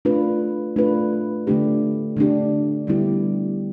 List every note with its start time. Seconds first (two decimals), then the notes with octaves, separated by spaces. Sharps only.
0.05 A3 D4 F4 B4
0.76 A3 D4 F4 B4
1.47 D3 A3 D4 G4
2.17 D3 A3 D4 G4
2.87 D3 G3 B3 E4 G4